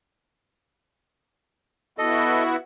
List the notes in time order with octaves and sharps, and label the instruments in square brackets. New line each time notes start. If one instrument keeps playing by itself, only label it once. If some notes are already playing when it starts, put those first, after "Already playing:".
[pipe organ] B3 E4 F#4 [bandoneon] A4 D#5